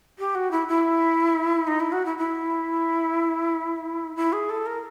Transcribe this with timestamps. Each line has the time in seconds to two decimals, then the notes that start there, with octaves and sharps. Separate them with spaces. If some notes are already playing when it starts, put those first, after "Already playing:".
0.19 G4
0.35 F#4
0.51 E4
0.68 E4
1.67 D#4
1.80 E4
1.92 F#4
2.05 E4
2.18 E4
4.16 E4
4.33 G#4
4.50 A4
4.66 A#4